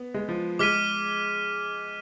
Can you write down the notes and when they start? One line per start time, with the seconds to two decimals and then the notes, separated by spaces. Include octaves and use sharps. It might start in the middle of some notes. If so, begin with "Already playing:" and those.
Already playing: B3
0.14 G#3
0.29 F3
0.59 G#3 D6 F6 B6 D#7